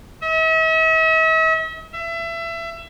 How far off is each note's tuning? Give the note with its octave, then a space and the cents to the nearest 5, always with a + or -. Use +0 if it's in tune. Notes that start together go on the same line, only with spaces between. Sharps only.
E5 -45
E5 +25